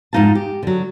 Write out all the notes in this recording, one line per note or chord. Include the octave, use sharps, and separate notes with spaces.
F2 G#2 G#3 D#4 F5 A5
G4
D3 F#3